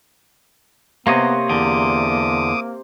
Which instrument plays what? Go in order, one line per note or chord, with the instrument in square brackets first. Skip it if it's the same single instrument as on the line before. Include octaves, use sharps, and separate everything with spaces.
[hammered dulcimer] C3 [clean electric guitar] A#3 C#5 D#5 [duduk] B3
[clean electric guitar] E2 D3 [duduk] A#3 [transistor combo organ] D6 D#6